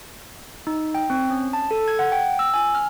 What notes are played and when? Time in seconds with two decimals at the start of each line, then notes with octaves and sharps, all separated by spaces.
0.67 D#4
0.95 G5
1.10 C4
1.30 C#4
1.53 A5
1.71 A4
1.88 G#6
1.99 F#5
2.12 G5
2.39 E6
2.54 G#5
2.75 F6